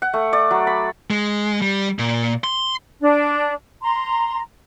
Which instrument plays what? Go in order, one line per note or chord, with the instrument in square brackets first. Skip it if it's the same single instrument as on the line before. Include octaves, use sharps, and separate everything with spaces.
[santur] F#5
A3
D5
F#3
B5
[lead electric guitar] G#3
G3
A#2
C6
[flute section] D4
A#5 C6